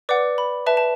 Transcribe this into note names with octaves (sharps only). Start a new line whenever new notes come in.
B4 D5 F#5 D6
B5
B4 E5 A5
A5